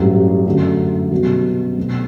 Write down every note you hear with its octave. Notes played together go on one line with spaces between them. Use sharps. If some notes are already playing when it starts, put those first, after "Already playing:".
Already playing: A1 G2 F#3 A3 C4
F#2 D3 F#3 A3
C2 B2 F#3
B1 B2 A3 C4